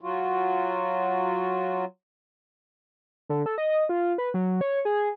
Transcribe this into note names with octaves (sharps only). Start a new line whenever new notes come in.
F#3 F4 F#4
D3
A4
D#5
F4
B4
F#3
C#5
G#4